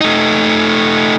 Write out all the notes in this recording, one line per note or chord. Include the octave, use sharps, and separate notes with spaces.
A3 D#4